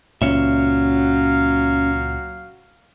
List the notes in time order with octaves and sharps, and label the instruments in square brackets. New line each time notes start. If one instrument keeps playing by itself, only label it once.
[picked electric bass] C#2 A#2 [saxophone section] F#3 F#4 F5 [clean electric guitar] C#4 C#5 E5